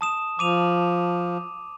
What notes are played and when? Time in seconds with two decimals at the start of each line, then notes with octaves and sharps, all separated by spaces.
0.01 A5 D#6 E7
0.39 F3 D6 D#7 F7